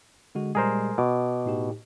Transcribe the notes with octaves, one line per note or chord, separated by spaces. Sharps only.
D3 G#3 F#4
A#2 G3 G#3 G#4 A#4 C5
B2 D6
A2 D#4 G4